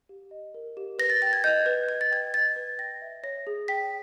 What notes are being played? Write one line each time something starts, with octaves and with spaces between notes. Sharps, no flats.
G4
D#5
A#4
G4
B4 A#6
A6
G5 A6
G#6
D#5 G6
B4
B4 G#6
A6
G5 G#6
D#5 A6
B4
G5 A#6
E5
C#5 A#6
G#4
G5 B6